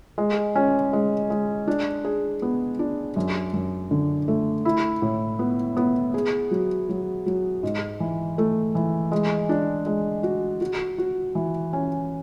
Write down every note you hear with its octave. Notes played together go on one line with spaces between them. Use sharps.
G#3
C#4
G#3
G#3
D4
G#4
B3
D4
F#2
F#2
D3
A3
E4
A2
B3
B3
G#4
F#3
F#3
F#3
G#2
E3
A3
E3
G#3
D4
G#3
F#4
F#4
F#4
E3
C#4